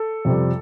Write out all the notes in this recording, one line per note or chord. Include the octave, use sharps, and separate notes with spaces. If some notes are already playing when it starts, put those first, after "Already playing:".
Already playing: A4
F2 C3 G3